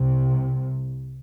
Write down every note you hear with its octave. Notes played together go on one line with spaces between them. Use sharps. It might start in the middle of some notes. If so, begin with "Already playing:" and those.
Already playing: C2 C3